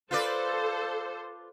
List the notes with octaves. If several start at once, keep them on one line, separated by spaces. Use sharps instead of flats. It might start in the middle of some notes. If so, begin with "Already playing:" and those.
F4 A4 B4 C5 D5